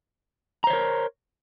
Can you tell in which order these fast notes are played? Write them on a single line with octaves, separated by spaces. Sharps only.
A#5 C5 C#5 A#4